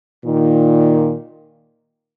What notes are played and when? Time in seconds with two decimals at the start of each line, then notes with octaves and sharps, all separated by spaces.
0.23 A#2 D#3